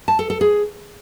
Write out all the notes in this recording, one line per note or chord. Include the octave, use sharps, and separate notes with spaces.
A5
A4
A4
G#4